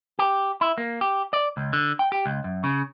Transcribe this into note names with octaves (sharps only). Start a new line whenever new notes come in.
G4
E4
A#3
G4
D5
C#2
D3
G5
G4
C#2
F#2
C#3